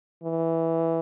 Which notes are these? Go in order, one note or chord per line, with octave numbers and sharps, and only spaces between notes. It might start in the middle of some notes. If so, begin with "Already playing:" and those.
E3